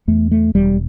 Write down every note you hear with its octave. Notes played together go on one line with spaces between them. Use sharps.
E2 A3
A3
E1 G3